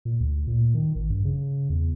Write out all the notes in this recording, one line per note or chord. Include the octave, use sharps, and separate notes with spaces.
A#2
D2
A#2
D#3
A1
G2
C#3
E2